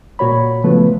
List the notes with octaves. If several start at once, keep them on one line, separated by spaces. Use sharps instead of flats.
A#2 F#4 C#5 B5
C#3 F3 A3 B3 B4